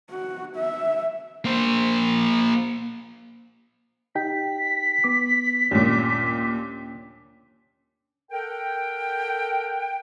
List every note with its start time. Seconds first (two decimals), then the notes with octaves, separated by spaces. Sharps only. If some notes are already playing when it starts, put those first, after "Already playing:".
0.10 F#4
0.57 E5
1.45 A#3 C5
4.15 D#4 G4 G5 B6
5.04 B3 D6
5.71 D#2 A#2 C#4 D4
8.31 A4 A#4 F#5 G5